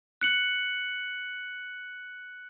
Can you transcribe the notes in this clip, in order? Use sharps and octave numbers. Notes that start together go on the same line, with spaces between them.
F#6 C#7 F#7